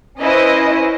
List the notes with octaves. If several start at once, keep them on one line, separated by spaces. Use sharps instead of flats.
C#4 E4 B4 C5 D#5